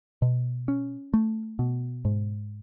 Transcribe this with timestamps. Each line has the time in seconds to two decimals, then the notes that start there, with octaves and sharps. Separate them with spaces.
0.22 B2
0.68 C#4
1.14 A3
1.59 B2
2.05 G#2